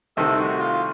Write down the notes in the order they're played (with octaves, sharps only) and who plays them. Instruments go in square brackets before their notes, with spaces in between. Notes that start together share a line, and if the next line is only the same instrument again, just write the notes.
[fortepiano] C2 C3 D#3 A3 C4 [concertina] A4
[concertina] F#4
F4